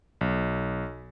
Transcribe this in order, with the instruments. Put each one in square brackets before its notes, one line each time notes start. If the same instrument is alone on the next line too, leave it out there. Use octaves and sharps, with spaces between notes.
[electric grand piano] B1